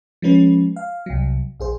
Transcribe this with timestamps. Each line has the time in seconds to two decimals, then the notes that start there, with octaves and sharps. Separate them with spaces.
0.22 F3 G#3 C#4 B4
0.76 F5
1.06 C2 F#3
1.60 A#1 G#4 C5